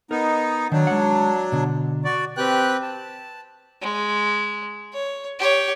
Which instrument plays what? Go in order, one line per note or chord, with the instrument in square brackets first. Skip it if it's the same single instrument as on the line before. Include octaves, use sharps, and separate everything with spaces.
[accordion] B3 D#4 [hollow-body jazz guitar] A#4
[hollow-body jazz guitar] D#3 [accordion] F#3 D4
[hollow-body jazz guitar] G#3 F#5
B2 D3
[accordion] F#4 D5
[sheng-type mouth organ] C4 G4 B4 G5 F#6
A5
[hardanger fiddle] G#3
C#5
G4 C#5